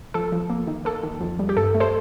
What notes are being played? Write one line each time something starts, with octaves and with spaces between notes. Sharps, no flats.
F3 A4
F3
A#3
D#3
A#3 A4
D#3
F2
G3
G4
G2 A4
A3
A4 C5